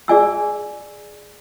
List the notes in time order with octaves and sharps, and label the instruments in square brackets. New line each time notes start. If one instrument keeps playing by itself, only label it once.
[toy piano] G#4 D5 G#5 E6